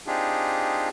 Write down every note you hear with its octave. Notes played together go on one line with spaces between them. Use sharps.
C4 D4 D#4 F4 G4 G#4